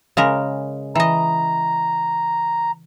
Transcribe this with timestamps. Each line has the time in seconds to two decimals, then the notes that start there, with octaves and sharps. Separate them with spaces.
0.17 C#3 G#3 A#4
0.95 E3 D#5 A#5